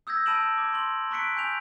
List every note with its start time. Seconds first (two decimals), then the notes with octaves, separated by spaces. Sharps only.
0.07 D#6 E6 G6 G#6 A#6
0.26 A5 B5 D7 E7 F#7
0.58 D6 G#6
0.73 C6 F#7
1.11 A#5 C#6 F#6 B6 C#7 D7
1.36 G#5 G6 D7 F7